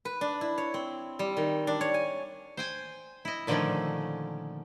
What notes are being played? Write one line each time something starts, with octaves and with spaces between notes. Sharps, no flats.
B4
D4
E4
C#5
C4
G3
D#3
D4
C#5
G#5
C5 G5 G#5
E4 D#5
A#2 D3 D#3 F3 A3 C#4